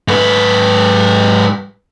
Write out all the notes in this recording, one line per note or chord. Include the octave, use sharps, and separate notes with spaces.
G#2 B4